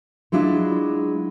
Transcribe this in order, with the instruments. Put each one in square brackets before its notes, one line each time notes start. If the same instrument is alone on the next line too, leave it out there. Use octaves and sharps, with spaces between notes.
[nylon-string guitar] F#3 G#3 D4 E4 F4